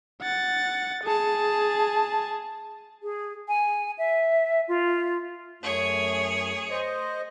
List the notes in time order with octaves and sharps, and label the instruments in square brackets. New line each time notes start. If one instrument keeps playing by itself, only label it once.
[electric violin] F#5 A6
G#4 A5
[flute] G#4
G#5
E5
F4
[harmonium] F#2 A3 [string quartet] G#4 C#5
[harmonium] C5 D#5